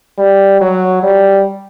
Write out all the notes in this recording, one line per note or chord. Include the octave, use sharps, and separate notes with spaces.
G3
F#3
G3